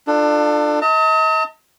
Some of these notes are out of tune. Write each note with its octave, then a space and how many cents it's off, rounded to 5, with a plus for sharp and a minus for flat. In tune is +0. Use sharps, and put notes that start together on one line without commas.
D4 +25 F4 +0 A4 +0
D#5 +40 A5 +45